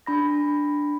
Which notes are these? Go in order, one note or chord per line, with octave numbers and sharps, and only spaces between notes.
D4 B5 A#6